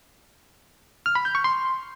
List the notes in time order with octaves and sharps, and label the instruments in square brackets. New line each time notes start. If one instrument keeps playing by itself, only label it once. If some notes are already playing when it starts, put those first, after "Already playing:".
[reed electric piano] F6
B5
G6
C#6
C6